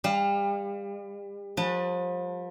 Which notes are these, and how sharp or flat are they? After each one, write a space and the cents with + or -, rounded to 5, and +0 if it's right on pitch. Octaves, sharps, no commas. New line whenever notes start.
G3 +35 F5 +0
F3 +35 B4 -15 A5 +30